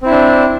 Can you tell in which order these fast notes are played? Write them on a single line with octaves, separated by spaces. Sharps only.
C4 E4 D4